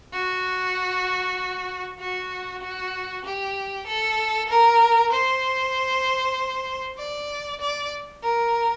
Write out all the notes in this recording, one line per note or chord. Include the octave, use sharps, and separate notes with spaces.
F#4
F#4
F#4
G4
A4
A#4
C5
D5
D5
A#4